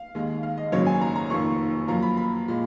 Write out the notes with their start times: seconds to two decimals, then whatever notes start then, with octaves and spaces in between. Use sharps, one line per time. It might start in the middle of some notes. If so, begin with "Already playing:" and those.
Already playing: F5
0.15 D#2 D#3 G#3
0.43 F5
0.58 D#5
0.72 G#1 F#2 C#3 F#3 A#3 C#5
0.87 G#5
1.01 A#5
1.16 A#5
1.30 F1 F2 D#3 A#3 C#6
1.88 F#2 F3 A#3 A#5
2.02 B5
2.17 B5
2.48 A#2 G#3